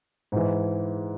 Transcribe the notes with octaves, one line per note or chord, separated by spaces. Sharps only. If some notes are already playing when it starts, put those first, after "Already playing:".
G#2 E3